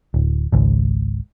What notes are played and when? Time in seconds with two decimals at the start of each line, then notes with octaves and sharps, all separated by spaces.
0.14 D1
0.52 G#1 C#2